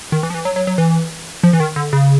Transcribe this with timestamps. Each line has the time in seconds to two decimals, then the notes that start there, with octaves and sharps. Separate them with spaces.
0.12 D#3
0.23 E3
0.30 F3
0.34 E3
0.45 F#3
0.56 F#3
0.67 F#3
0.78 E3
1.43 F3
1.53 E3
1.60 D#3
1.76 D3
1.93 C#3